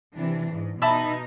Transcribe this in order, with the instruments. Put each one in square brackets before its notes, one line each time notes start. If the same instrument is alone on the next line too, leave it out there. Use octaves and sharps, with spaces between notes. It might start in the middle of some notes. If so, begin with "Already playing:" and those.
[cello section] C3 E3 D4
G#2
[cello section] B2 D#4 [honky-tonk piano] E5 A5 B5